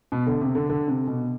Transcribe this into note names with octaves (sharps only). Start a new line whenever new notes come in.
B2
D3
C3
D3
D3
C3
B2